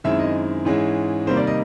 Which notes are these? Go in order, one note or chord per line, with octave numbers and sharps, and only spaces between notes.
F#2 D#3 G#3 C4 E4 E5
D#5
G#2 E3 G#3 C#4 E4
C3 D#3 G3 A#3 C5
D5
D#5